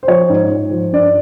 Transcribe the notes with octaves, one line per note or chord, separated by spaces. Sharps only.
C5
F3 C#5
G#2
G#2
F3
G2 D5